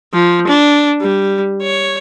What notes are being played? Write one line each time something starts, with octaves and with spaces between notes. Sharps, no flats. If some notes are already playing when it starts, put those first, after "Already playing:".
F3
D4
G3
C#5